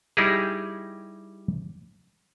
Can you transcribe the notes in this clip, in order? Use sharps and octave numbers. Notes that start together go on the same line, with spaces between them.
G3 D#4 E4 G4 G#4